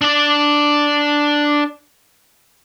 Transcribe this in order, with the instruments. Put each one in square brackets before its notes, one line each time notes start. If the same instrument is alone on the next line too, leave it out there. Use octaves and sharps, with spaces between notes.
[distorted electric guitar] D4 D5